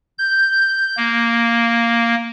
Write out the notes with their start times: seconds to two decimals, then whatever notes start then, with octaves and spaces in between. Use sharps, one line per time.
0.19 G6
0.97 A#3